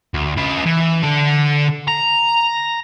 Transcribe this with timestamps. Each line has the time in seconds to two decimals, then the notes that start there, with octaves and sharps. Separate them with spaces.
0.14 D2
0.37 C#3 B4
0.66 E3
1.03 D3 A4
1.88 A#5